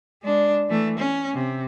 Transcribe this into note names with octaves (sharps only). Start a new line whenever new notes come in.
G#3 D4
E3 A3
C#4
C3